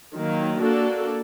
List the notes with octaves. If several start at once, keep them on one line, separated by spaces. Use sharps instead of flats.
D#3 F#3 A#3
A#3 D4 F#4 A4